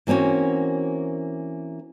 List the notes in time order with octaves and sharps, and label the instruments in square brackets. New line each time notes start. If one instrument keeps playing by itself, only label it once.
[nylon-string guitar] E3 A#3 C4 C#4 F#4